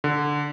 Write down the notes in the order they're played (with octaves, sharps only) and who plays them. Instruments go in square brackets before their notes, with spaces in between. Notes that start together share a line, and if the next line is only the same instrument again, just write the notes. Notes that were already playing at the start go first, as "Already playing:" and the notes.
[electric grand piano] D3